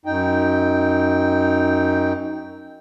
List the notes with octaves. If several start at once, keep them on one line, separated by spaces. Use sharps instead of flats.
F#2 D#4 G5